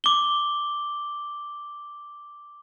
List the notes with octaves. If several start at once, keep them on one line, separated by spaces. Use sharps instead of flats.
D6 G7